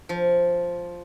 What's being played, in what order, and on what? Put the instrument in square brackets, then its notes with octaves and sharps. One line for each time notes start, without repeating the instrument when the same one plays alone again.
[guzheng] F3